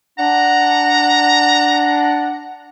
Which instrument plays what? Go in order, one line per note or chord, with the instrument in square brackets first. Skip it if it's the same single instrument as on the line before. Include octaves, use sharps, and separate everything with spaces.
[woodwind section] D4 [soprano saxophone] F#5 [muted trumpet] A#5